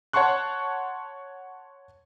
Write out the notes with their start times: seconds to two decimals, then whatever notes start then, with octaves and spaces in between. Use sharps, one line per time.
0.13 C#5 F#5 A5 C6 C#6 F#6